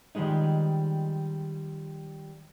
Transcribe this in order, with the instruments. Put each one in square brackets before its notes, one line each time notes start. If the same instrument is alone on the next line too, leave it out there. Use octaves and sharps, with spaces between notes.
[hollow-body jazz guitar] D#3 F3 G3 G#3 D#4